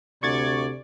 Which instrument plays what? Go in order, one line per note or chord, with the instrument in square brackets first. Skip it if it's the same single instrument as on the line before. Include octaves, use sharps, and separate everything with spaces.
[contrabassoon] D2 [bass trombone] C3 [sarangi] D5 [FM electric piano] C#6 G#6 A6